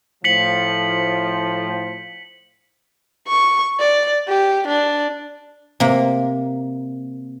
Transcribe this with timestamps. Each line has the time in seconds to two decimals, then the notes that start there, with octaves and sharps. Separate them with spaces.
0.24 A2 F3 B6 C#7 F#7
3.28 C#6
3.80 D5
4.28 G4
4.68 D4
5.80 C3 A#3